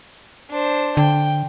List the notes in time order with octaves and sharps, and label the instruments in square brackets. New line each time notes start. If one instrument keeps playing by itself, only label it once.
[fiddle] D4 C5
[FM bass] D3 [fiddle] G5